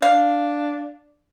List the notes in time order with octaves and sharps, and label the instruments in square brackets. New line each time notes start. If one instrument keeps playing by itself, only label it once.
[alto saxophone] D4 [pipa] F5